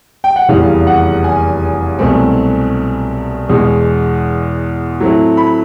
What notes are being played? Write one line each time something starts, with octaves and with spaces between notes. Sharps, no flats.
G5
F#5
F1 E2 C#3 E3 G3 F5
F#5
G#5
C2 B2 F#3 A3 C4
E2 B2 G#3
A2 F#3 A3 C4 E4
B5